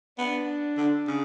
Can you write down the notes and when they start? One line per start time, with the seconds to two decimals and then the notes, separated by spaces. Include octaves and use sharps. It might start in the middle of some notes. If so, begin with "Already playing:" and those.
0.18 B3 D4
0.77 D3
1.07 C#3